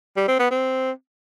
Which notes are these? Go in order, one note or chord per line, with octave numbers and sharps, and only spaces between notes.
G3
C4
B3
C4